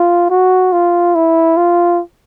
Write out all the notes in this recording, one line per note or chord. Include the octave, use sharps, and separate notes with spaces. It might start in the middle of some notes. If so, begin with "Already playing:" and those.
Already playing: F4
F#4
F4
E4
F4